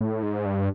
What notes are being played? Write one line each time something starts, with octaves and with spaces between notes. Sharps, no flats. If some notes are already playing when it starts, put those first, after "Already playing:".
A2
G#2
G2